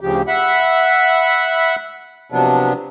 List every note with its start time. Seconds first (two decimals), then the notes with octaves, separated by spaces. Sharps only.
0.01 D2 C#3 F3 G4
0.28 E5 F#5 B5
2.32 C3 F3 F#3 B3 D4